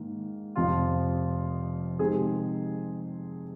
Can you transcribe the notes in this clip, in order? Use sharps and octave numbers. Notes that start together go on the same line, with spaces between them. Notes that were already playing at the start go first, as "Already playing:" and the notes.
Already playing: G#2 D#3 A#3
F1 F2 F3 C4 F4
C3 D#3 G#3 C4 G#4